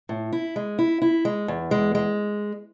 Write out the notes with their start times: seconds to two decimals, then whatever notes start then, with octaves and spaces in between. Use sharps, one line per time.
0.09 A2
0.33 E4
0.56 G#3
0.78 E4
1.02 E4
1.25 G#3
1.48 E2
1.71 G#3
1.95 G#3